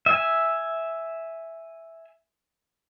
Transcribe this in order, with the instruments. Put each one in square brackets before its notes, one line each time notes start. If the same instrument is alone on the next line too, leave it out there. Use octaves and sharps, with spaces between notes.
[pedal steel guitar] E5 G#5